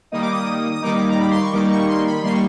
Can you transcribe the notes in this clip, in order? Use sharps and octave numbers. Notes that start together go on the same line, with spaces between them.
D#3 G3 A#3 D#4 D#6
D6
D#6
D#6
D#3 G3 A#3 D#4 D6
A#5
B5
C6
C#6
D#3 G3 A#3 D#4 D6
C#6
C6
B5
D#3 G3 A#3 D#4 C6
C#6